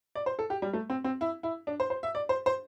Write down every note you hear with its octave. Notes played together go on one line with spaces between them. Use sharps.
D5
C5
A4
G4
G3
A3
C4
C4
E4
E4
D4
C5
C5
E5
D5
C5
C5